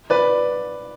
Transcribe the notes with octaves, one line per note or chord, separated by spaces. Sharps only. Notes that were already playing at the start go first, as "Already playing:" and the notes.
B4 D5